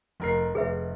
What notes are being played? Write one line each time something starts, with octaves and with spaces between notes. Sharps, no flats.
F1 A#4 C7
F1 G#4 B4 E5